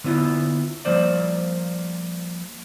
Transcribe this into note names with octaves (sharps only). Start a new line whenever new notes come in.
D3 B3 E4 F4
F3 G3 A#3 C5 D5